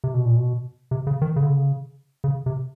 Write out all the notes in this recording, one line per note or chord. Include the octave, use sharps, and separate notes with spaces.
C3
B2
A#2
B2
C3
C#3
D#3
C#3
D3
C#3
C#3
C3